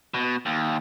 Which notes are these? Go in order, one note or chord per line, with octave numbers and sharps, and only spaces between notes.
B2
D#2